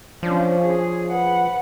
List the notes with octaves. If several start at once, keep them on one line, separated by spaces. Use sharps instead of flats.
F3 C#4 D4
G#4
B4 F#5